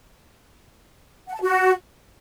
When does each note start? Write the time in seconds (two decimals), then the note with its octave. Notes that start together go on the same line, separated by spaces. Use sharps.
1.28 F#5
1.35 A5
1.41 F#4